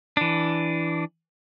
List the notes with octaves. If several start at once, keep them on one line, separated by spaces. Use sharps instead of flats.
E3 D4